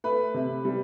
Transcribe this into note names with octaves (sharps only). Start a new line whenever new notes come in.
A3 B4 B5
C3
G3